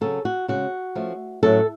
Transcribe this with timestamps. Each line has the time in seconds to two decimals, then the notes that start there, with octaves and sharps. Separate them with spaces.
0.01 C#3 F#3 C#4 A4
0.25 F#4
0.48 C#3 G#3 C#4 F#4
0.95 F3 A3 C#4
1.43 A2 F#3 C#4 A4